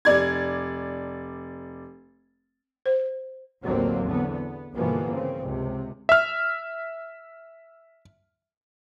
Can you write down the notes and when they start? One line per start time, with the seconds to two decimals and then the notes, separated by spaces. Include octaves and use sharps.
0.05 F1 D5 G#6
2.86 C5
3.63 A1 D#2 D3 F#3 A#3 C4
4.02 E2 D3 B3
4.32 B3
4.75 G1 B2 E3 F3 A#3 B3
5.11 C#3 C4
5.42 C#2 C3
6.09 E5 F6